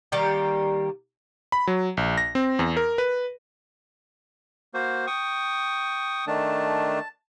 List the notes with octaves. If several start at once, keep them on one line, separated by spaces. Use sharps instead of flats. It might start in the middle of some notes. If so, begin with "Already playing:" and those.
D#3 G3 A#3 G4
B5
F#3
A#1
A#6
C4
E2
A#4
B4
A#3 F#4 C5
G5 C#6 D#6
D#3 A3 D4 A5